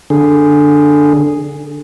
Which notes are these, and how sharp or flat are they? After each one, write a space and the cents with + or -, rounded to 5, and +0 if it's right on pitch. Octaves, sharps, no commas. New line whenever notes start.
D3 +5 G#4 -5